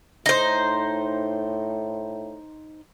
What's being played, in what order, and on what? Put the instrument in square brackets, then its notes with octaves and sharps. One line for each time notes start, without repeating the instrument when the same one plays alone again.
[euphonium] A2 [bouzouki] D#4 C5